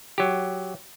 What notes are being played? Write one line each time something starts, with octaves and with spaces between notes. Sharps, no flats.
F#3 G4